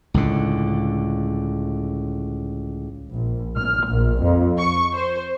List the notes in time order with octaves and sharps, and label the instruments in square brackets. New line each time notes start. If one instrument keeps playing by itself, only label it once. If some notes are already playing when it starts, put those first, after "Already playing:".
[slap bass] C#2 A2 D3
[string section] A#1
F6
A#1
F2
C#6
C5